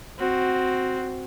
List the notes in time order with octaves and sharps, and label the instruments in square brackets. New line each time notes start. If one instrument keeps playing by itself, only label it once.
[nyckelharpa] C4 F#4